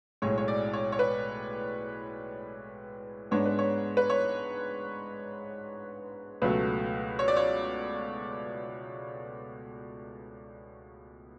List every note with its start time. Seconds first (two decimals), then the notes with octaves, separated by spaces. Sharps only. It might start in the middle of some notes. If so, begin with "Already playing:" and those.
0.22 B1 A2 G#3 C#5
0.38 C#5
0.48 D5
0.73 C#5
0.92 C#5
0.99 B4
3.31 G#2 G#3 B3 D4 C#5
3.45 B4
3.59 C#5
3.97 B4
4.10 C#5
6.42 C#2 B2 F#3 A3 B4
7.19 C#5
7.28 D5
7.37 C#5